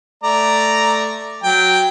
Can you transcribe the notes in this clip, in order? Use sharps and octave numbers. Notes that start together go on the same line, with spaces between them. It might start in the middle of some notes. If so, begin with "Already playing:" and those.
A3 D5 A#5
F#3 G5